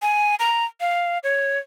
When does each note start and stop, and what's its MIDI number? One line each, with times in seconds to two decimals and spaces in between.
0.02 0.35 80
0.40 0.65 82
0.81 1.18 77
1.24 1.59 73